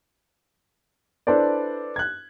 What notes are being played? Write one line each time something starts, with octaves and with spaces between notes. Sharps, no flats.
D4 E4 A4 B4 C5 D5
F#6 G#6